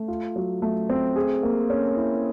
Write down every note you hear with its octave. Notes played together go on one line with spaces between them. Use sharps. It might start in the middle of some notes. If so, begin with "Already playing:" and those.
Already playing: A3
F4
F#3
A3
C4
G#4
A#3
C#4
E4